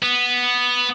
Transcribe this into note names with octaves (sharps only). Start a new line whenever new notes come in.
B3